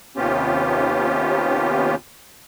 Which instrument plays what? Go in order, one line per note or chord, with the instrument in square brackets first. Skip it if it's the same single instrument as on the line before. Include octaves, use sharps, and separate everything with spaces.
[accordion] D#2 C3 B3 C#4 F4 G4